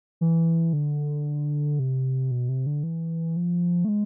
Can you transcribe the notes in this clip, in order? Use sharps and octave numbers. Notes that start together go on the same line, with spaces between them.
E3
D3
C3
B2
C3
D3
E3
F3
A3
G#3